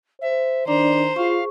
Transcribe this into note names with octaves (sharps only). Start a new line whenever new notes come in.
C5 E5
D#3 D4 C5 D5 A#5
F4 G#4 F5 C#6